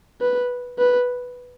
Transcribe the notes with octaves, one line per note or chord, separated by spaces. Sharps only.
B4
B4